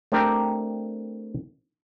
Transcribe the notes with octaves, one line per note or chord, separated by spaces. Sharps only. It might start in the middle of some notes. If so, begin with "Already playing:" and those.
A3 C4 D4 G4 A#4 G5